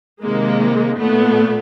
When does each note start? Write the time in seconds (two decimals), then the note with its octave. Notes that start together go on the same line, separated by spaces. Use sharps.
0.23 C3 D#3 G#3 A#3
0.98 A#2 A3 B3